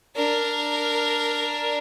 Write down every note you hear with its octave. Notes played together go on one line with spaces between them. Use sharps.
D4 A#4